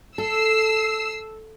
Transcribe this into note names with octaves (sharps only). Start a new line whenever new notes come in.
A4 E6 C7